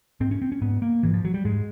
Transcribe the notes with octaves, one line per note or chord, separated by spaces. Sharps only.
G#2 C4
C#4
C4
C#4
G#2 B3
A#3
G#2 E3
F3
F#3
G3
G#2 G#3